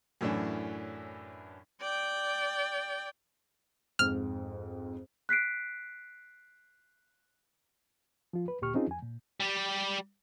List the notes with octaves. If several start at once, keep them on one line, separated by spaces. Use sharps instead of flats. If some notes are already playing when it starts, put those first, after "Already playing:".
F#2 A2 E3 C#4 D4
D5 G5
F2 G#2 F6
F#6 B6 C7 D7
F3 F4
B4
D2 A#2 G4 C#6 F6
C4 C#4 D#4 F4 G#4
F2 G#5
A#2
G3 G4